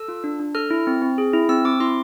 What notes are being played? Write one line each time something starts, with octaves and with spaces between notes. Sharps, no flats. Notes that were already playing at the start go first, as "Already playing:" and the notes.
Already playing: A4 E6
F4
D4
D4
A4 F6
E4
C4
C4
G#4
E4
C4 E6
C4 D6
E4 C6